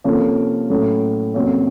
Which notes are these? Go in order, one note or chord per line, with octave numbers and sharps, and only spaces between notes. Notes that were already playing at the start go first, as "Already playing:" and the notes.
C3 F3 A#3 C#4 A4
A2 F#3 A3 C#4
F2 C3 F#3 A#3 C#4